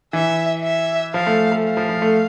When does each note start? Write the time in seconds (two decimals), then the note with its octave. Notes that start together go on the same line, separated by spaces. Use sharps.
0.13 E3 E5
0.64 E5
1.14 F3 F5
1.27 A3
1.52 A3
1.64 F5
1.77 F3
1.89 F3
2.02 A3